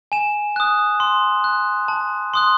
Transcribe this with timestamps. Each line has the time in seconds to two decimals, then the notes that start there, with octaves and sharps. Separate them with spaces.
0.12 G#5 E7
0.56 D#6 F#6
1.00 C6
1.44 F#6
1.88 A5
2.34 C6 D#6 F#6